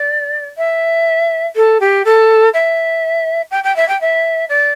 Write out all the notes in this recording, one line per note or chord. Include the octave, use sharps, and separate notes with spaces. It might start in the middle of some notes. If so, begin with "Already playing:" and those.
Already playing: D5
E5
A4
G4
A4
E5
G5
G5
E5
G5
E5
D5